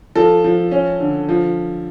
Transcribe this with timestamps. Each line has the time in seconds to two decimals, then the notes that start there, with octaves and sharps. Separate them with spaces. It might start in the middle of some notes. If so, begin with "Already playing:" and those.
0.15 F3 A4
0.44 F3
0.71 C#4
1.00 D3
1.29 F3